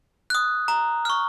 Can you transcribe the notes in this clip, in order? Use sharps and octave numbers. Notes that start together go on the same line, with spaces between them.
D#6 F#6
A#5
C#6 F6